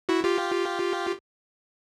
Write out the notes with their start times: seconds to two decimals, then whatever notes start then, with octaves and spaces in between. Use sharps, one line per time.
0.09 E4 F#4
0.24 F4 G4